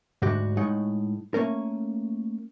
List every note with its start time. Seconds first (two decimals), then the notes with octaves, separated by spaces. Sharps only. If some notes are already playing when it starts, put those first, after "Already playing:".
0.22 D2 G#2 D3 D4 F#4 G4
0.57 A2 G#3 D#4 C#5 F#5
1.34 A3 A#3 C#4 A#4